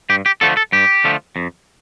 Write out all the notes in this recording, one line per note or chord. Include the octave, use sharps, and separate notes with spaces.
G2 G4
G4
D3 F3 A3 A4
A4
G2 G4
D3 F3 A3
F2